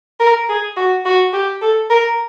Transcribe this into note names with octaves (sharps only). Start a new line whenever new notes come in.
A#4
G#4
F#4
F#4
G4
A4
A#4